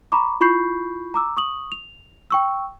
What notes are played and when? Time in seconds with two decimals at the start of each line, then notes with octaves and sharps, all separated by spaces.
0.12 A#5 B5 C#6 D6
0.40 E4 F4 B5 C#6 G6 C7
1.14 A#5 D6 E6
1.37 C#6 D#6 F#7
1.72 F7
2.31 G5 C#6 E6